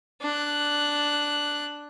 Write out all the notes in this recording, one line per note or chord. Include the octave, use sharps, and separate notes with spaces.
D4 F#6